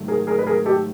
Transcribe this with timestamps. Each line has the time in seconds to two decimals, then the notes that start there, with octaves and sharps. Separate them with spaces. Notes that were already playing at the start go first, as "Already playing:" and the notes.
Already playing: G#2 D#3 F#3 A3
0.08 G#4 A#4
0.27 G#4 A#4
0.39 B4
0.46 G#4 A#4
0.66 G4 A4